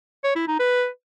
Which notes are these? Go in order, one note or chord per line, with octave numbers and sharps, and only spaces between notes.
C#5
E4
D#4
B4